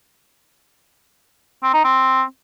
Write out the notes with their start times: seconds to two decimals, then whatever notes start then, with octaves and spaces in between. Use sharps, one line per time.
1.63 C4
1.74 D#4
1.85 C4